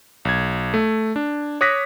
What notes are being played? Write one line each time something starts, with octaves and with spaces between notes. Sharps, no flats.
B1 G#6
A3
D4
C#5 D6 D#6 F#6 A#6 B6